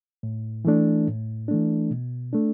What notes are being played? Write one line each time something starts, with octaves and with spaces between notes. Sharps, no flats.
A2
E3 A3 D4
A2
E3 A3 D4
B2
A3 D4